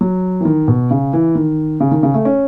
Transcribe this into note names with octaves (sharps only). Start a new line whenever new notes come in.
F#3
E3
D#3
B2
C#3
E3
D#3
C#3
D#3
C#3
A3
C#4